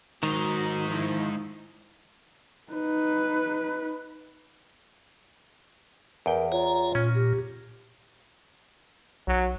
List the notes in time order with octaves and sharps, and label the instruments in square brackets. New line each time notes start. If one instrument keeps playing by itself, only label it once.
[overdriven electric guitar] G#2 D#4 [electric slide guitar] D#3 [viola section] F#3
[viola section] F3 E4
[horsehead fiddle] D#4 B4
[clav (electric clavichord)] E2 G5 [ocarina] A#4
[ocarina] F4 [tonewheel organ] C#5 A#5
[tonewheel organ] A#2 [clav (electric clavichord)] C#4
[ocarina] G4
[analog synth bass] B1 [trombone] F#3